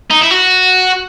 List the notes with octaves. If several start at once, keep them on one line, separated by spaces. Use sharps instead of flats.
D#4
E4
F#4